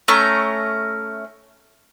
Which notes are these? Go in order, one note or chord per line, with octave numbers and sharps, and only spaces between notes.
A3 C#4 A#5